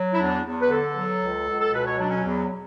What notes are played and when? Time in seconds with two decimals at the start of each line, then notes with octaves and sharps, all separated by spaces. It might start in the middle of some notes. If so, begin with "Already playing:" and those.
Already playing: F#3
0.14 E4
0.19 E2 D4
0.45 E2
0.61 B4
0.70 D3 A4
0.96 F#3
1.22 C#2
1.48 C#2
1.60 A4
1.73 B2 B4
1.86 C#5
1.98 F#3 D4
2.11 C#4
2.24 E2